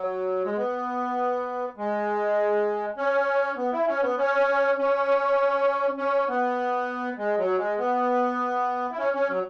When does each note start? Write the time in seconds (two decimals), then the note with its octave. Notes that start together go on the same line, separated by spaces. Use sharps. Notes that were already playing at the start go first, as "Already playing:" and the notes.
Already playing: F#3
0.45 G#3
0.57 B3
1.77 G#3
2.97 C#4
3.57 B3
3.72 E4
3.87 C#4
4.02 B3
4.18 C#4
4.78 C#4
5.97 C#4
6.29 B3
7.18 G#3
7.38 F#3
7.58 G#3
7.78 B3
8.92 E4
8.98 C#4
9.14 C#4
9.29 F#3